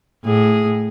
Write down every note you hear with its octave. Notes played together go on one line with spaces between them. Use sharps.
A2 G#4